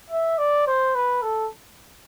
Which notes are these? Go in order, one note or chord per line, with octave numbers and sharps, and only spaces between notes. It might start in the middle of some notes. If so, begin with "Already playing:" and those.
E5
D5
C5
B4
A4